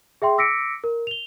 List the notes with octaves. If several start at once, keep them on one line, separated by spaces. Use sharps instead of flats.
G#4 E5 G5 C6
D6 E6 A#6 B6 C#7 D7
A#4
F7 G7